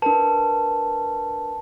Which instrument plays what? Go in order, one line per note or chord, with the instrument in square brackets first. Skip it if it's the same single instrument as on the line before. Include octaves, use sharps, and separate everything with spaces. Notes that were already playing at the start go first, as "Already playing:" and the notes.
[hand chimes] D4 A#4 B4 [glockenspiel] A5